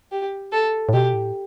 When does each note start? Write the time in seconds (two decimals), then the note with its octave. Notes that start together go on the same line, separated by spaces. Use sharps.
0.12 G4
0.52 A4
0.89 A2
0.93 B2 G4
1.14 A2